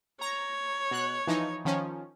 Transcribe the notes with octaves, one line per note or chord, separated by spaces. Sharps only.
C#5 A#5
B2 F#6
E3 F3 D#4
D#3 F3 C#4